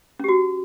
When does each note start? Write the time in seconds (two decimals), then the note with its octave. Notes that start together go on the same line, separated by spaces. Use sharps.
0.20 C#4
0.24 G4
0.29 F#4